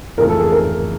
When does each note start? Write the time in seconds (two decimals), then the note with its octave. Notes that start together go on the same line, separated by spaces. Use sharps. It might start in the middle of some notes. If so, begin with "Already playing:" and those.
0.18 F2 C#3 E3 A3 A#4
0.29 A4
0.40 G#4
0.52 A#4